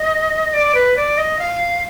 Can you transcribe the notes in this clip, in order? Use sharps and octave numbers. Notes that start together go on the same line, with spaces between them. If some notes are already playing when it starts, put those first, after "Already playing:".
Already playing: D#5
D5
B4
D5
D#5
F5